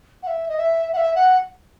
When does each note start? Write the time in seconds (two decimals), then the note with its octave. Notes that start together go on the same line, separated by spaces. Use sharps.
0.23 F#5
0.27 E5
0.48 D#5
0.57 E5
0.93 F#5
0.97 E5
1.15 F#5